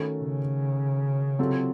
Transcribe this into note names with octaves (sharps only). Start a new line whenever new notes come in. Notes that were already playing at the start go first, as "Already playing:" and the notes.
Already playing: D#3 A3 C#4 F#4 A4
C#3
C3 F#3 C4 F4 A4